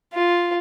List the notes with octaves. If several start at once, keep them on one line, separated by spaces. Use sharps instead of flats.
F4